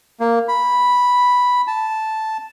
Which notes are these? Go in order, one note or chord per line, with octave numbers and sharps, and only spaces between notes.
A#3
B5
A5